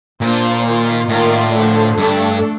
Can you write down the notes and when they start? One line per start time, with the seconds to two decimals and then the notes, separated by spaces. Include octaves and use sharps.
0.21 A#2 A#3 D4 F4 C5
0.65 D#3 A#3 F4
1.09 A2 D#3 A#3 F4 A#4 D5
1.54 D3 F3 A3
1.98 G2 A3 D4 A4